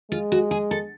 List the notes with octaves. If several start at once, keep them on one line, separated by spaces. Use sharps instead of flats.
G#3 F4
F#4
G#4
A4